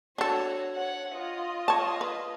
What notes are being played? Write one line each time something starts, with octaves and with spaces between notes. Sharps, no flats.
D4 F#4 A4 C#5
C#5 F#5
F4 D#5
C#5 A5
B4